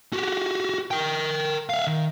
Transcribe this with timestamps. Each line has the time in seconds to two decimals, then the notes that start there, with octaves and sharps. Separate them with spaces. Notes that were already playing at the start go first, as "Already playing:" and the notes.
0.13 F#4 G4
0.91 A#4 G5
1.69 E5 F5
1.87 D#3